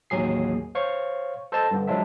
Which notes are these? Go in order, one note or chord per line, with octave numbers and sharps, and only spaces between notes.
A1 D#2 F#3 G#4 C7
C5 C#5 F5 C#6
A4 C5 D#5 A5
G2 D3
F3 F#3 G#3 D4 E5